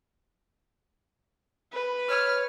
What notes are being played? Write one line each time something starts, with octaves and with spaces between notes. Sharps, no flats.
B4
C#5 F6